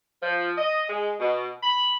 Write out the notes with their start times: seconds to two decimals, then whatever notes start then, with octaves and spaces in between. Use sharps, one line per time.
0.22 F3
0.57 D#5
0.89 G#3
1.20 B2
1.63 B5